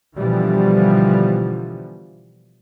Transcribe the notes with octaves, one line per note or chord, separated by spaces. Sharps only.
B2 D3 E3 F3 G3